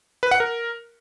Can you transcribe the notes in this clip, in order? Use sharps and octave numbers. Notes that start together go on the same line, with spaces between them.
B4
F#5
A#4